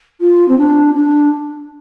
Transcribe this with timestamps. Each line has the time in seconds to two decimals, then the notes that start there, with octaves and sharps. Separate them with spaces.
0.20 F4
0.48 C4
0.58 D4
0.95 D4